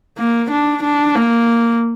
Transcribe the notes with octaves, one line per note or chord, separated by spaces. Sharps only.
A#3
D4
D4
A#3